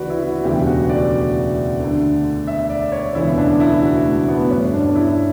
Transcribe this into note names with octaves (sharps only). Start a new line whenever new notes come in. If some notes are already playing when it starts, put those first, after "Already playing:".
Already playing: D2 C#3 E3 F#4 B4 D5
E4
F#4
E1 D2 C#3 E3 G4
F#4
D5
D2 D3
E5
D5
C#5
E1 D2 C#3 E3 E4
D4
E4
F#4
A3
B3
G1 G2 D3 C#4
D4
E4